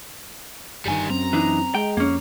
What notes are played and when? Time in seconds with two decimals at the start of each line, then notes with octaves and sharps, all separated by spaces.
0.86 G1 G2 D#3 G3 G#5
1.10 F#2 C4 A#5
1.33 E3 D4 D#4
1.75 G#3 G5
1.97 F2 A#3 C#4